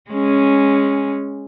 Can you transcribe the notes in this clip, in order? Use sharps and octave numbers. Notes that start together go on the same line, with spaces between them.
G#3 C#4